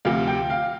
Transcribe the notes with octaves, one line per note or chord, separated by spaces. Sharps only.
D2 C3 F3 F5
G5
F5